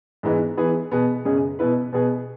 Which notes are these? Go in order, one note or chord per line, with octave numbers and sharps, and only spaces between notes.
G#2 E3 G#3 B3
E3 B3 G#4 B4
B2 B3 G#4 B4
F#2 C#3 G#3 C#4 G#4
B2 B3 E4 B4
B2 B3 G#4 B4